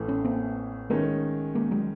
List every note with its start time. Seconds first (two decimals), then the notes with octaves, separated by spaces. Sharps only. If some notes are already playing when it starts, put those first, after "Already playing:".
Already playing: A1 A2 E3 A3
0.08 B3 C#4
0.25 A#3 C4
0.90 D#3 G#3 A3 B3 C#4
1.55 G#3 A#3
1.71 F#3 G#3